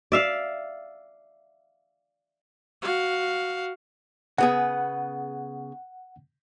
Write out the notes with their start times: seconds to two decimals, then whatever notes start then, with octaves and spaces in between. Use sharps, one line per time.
0.12 D5 E5 F5
2.82 F#4 F5
4.38 C#3 B3 G#4 F#5